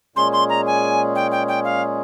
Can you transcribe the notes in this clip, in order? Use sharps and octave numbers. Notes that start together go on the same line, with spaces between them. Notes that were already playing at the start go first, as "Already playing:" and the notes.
A#2 G#3 C#4 G#4 C6
C6
A#5
G#5
G5
G5
G5
F5